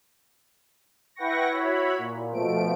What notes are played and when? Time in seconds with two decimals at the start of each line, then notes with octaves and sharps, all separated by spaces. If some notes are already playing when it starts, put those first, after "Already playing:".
1.15 E4 B4 F#5 G5 C#6 A#6
1.48 E4 F#4 C#5 B5
1.98 A#2
2.32 B2 F3 A3 D7